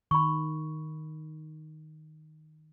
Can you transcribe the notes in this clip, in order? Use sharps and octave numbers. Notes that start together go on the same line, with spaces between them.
D#3 B5 C#6